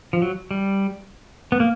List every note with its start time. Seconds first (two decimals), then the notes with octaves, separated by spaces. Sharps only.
0.13 F3
0.22 F#3
0.51 G3
1.52 B3
1.60 A#3